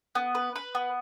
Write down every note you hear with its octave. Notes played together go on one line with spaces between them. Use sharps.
B3
B4
B4
B3